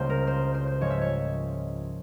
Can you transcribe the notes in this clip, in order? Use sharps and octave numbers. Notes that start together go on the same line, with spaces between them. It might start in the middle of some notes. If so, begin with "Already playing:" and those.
Already playing: C#2 C#3 G3 A#3 C5
A#4
C5
C5
C5
G#2 F3 G#3 C#5
E5
C#5